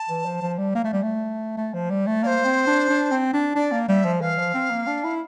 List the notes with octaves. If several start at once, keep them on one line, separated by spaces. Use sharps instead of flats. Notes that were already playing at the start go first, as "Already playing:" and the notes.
Already playing: A5
E3
F3
F3
G3
A#3
A3
G3
A3
A3
F3
G3
A3
A#3 C5 D5
C4
D4
D4
C4
D4
D4 D5
A#3
G3 E5
F3
E3 F5
F3
C4
A#3
D4
E4